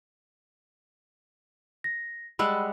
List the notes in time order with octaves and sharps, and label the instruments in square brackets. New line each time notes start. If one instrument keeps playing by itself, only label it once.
[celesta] A#6
[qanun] G3 G#3 F#5 [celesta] B5 E6